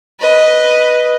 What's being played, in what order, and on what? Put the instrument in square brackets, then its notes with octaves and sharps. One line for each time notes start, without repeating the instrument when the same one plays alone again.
[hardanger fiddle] B4 D#5